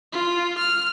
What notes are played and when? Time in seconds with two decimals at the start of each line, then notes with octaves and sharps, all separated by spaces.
0.13 F4
0.59 F6